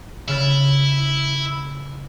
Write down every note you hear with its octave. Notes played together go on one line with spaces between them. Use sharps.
C#3 E4 F6 A6